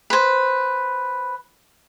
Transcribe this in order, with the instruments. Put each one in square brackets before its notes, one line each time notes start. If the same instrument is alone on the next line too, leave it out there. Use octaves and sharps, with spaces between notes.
[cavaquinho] B4 C5